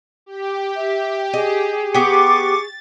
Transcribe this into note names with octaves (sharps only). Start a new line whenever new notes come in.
G4
E5
G#4 D#5
B3 G4 C#6 D6 A6